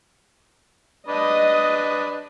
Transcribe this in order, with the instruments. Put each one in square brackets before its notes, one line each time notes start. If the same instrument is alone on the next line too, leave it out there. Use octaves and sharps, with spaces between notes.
[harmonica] D4 B4 [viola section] D#5